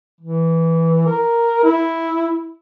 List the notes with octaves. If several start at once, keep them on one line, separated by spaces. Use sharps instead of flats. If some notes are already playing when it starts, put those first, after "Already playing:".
E3
A#4
E4